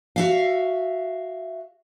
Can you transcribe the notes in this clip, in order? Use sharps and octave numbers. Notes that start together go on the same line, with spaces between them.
F#4 E5 F5